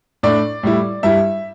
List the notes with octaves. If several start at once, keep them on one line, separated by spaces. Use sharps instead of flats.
A2 A3 D4 D5
A2 G3 E4
G2 G3 E4 E5